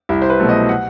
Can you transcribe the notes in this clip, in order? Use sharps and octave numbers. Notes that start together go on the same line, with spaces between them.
C2 E4
C5
B4
B2 F#3 A3
D#5
F#5